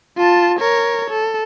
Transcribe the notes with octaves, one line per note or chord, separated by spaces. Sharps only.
F4 A5
A#4 C#5
A4